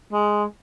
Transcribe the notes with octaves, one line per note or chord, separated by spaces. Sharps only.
G#3